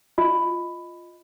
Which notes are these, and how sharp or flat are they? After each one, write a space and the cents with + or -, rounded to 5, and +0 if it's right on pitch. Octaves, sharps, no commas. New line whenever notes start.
F4 +0 D#5 +0